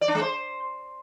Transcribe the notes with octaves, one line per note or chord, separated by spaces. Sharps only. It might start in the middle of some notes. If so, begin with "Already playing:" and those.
D5
D4
G#3
C5